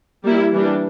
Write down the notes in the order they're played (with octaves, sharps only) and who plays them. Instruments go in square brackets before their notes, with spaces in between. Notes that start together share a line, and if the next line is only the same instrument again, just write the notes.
[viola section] G3 A#3 E4
E3 G3 D4